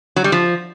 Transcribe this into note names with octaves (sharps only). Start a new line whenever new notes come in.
F#3
G3
F3